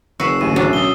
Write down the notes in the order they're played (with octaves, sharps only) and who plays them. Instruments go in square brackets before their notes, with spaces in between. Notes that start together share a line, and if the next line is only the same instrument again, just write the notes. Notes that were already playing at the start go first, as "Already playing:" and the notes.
[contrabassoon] F#1 [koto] F#4 B4 [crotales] E6 C7 E7
[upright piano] A1 D2 [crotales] D#7
[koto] B2 F#3 D4
[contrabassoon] F#2 [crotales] D#6 G7